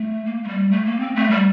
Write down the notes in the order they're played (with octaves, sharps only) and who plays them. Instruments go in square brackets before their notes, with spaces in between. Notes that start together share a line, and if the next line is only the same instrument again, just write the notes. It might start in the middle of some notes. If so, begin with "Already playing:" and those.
Already playing: [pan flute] A3
A#3
A3
G3
A3
A#3
C4
A3
G3